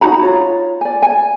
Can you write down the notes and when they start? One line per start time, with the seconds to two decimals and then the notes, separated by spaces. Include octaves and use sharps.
0.01 D#4 F#4 A#5 B5
0.22 F4 C#5
0.81 D5 G#5
1.02 G#5